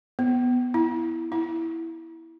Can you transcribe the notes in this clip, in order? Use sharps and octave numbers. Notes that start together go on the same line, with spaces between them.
B3
E4
E4